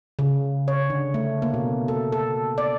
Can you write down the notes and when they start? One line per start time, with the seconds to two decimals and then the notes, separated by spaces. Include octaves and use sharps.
0.19 C#3
0.68 C#5
0.90 D3
1.14 A3
1.42 A#3
1.54 B2
1.88 A4
2.12 A4
2.58 D5